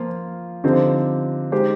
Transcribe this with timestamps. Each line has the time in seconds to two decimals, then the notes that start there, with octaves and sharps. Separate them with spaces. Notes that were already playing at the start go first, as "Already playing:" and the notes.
Already playing: F3 A#3 F4
0.64 D3 F3 C4 D#4 G4
1.52 G#3 D#4 G4 C5